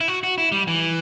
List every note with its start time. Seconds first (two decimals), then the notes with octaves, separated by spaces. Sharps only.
0.01 E4
0.08 F#4
0.23 F#4
0.38 E4
0.52 G3
0.67 E3